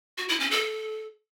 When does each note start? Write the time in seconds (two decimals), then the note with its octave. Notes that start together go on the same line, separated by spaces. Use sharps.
0.18 F#4
0.29 E4
0.40 C#4
0.51 A4